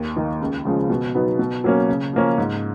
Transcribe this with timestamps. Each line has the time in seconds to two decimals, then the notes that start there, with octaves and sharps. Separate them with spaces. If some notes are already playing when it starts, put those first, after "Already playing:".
Already playing: D#2
0.16 D#3 A#3 D#4
0.41 C#2
0.65 C#3 F3 G#3
0.90 B2
1.15 F#3 B3 D#4
1.39 B2
1.64 F#3 A#3 C#4
1.89 C#3
2.13 F3 A#3 C#4
2.38 G#2